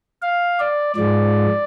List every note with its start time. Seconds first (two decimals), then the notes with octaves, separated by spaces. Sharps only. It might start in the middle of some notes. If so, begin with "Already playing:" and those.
0.22 F5
0.60 D5
0.96 G#2 F3 G#3 D5